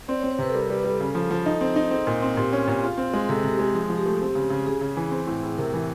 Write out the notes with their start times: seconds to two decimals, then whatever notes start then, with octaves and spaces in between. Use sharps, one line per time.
0.08 C4 D5
0.19 C4 C#5
0.31 C5
0.39 C3 B4
0.49 A4
0.54 G3 A#4
0.66 B4
0.70 G3
0.77 B4
0.85 G3 A4
1.00 C#3
1.15 F3
1.31 F3
1.46 D#4
1.61 C4
1.76 D#4
1.91 C4 G#4
2.07 A#2
2.22 C4
2.37 A#2 G4
2.52 C#4
2.67 A#2
2.83 F4 G#4
2.98 C4
3.14 G#3
3.29 C3 A4
3.44 C3
3.52 G4
3.59 G#3
3.74 F3 G#4
3.90 F3
3.98 G4
4.06 A3
4.21 C4
4.35 C#3
4.50 C#3
4.66 C#3 G#4
4.81 C#3
4.97 E3
5.11 C4
5.27 A2
5.43 A2
5.57 C3 A#4
5.74 E3